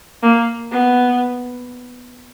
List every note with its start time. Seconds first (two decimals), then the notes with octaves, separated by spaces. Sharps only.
0.23 A#3
0.71 B3